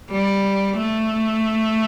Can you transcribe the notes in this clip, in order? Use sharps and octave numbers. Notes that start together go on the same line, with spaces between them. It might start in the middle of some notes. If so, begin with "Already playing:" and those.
G3
A3